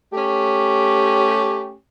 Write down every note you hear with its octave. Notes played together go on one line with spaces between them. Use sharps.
A3 C#4 G4